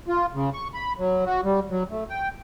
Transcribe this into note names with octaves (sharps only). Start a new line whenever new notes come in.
F4
C#3
C#6
B5
F#3
F#4
G3
F#3
A3
G5